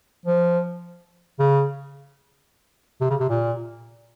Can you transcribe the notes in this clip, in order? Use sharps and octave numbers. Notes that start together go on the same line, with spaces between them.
F3
C#3
C3
C#3
C3
A#2